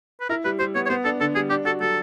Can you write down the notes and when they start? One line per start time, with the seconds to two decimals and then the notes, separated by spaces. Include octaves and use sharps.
0.21 B4
0.29 E4 A#4
0.45 G3 B4
0.60 G3 C5
0.75 B3 C#5
0.86 C#5
0.90 B3 C5
1.05 D4 A4
1.21 D3 A4
1.35 G3 G#4
1.50 D4 G4
1.65 F#4 A4
1.81 F#3 A4